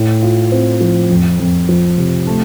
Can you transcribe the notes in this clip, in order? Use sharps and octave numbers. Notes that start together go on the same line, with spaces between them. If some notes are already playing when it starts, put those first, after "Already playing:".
Already playing: A2
F4
C4
F3
F2
F2
F3
C3
A3